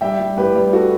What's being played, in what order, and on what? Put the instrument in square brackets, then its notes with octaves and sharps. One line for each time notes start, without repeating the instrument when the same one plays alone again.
[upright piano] G3 E5 G5
G3
A1 G4 B4
G3
F#4 A4